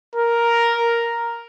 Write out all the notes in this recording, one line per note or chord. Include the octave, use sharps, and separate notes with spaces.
A#4